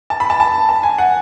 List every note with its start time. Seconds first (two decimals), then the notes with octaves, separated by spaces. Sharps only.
0.10 A5
0.20 B5
0.30 A5
0.40 A5
0.69 A5
0.83 G#5
0.98 F#5